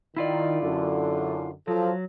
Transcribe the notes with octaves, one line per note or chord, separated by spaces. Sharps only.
D#3 E4 F4 D5
F#2 D3
F3 F#3 A4